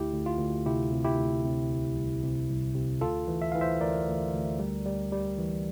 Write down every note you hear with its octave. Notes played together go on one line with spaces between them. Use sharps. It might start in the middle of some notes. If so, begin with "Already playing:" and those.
Already playing: D2 E4 G4
D2
F4
D2
C3 E4 G4
C3
E4 G4
D2
C3
C2
C2
C3
C2
C3
D2 F4 A4
E3
E5
E3 F5
C5 E5
D2 A#4 D5
D2
D2
G3
G3
G3
E3